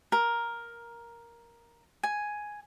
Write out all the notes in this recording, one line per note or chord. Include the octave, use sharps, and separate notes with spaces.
A#4
G#5